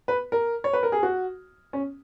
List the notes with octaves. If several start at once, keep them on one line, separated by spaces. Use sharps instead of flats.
B4
A#4
C#5
B4
A#4
G#4
F#4
C#4